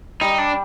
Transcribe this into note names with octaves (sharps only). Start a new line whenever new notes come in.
G3 D#4
D4